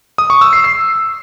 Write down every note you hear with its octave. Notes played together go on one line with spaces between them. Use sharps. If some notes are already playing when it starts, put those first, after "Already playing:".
D#6
C#6
E6
C7
C7